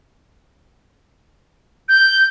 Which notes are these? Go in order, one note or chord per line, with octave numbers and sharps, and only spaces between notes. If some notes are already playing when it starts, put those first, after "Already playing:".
G6